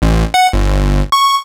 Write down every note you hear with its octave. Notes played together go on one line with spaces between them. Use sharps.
A1
F#5
G1
C#6